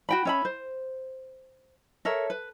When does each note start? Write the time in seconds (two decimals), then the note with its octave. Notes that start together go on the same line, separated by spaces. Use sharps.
0.09 F#4 G5 B5
0.25 C#4 E5 B5
0.45 C5
2.05 A4 A#4 C#5 E5
2.30 B4